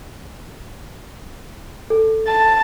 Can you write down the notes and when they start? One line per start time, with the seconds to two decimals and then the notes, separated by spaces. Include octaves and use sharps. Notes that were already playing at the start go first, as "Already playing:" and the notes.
1.90 A4
2.27 A5